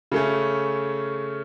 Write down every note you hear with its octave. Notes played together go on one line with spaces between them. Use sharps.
C#3 A3 C#4